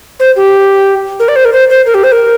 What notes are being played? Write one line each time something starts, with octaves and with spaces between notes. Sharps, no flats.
C5
G4
A#4
D5
C5
A#4
C5
C5
A#4
G4
C5
A#4